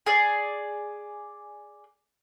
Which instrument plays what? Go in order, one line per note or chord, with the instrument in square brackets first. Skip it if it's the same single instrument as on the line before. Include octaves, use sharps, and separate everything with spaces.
[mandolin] G#4 D5